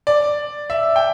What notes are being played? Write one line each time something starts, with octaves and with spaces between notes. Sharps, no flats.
D5
E5
G5